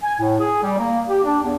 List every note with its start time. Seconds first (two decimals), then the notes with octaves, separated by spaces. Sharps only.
0.03 G#5
0.20 A2
0.40 G#4
0.63 G3
0.77 A#3
1.10 G4
1.24 D4
1.43 E2